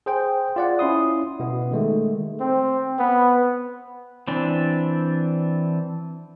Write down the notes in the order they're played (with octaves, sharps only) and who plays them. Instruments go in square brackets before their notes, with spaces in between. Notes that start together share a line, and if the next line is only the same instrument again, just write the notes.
[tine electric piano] G#4 C5 G5
F4 D5 F#5
C#4 E4 C6 D#6
B2 B3
D#3 G#3 A3
[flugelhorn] C4
B3
[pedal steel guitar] E3 C4 D4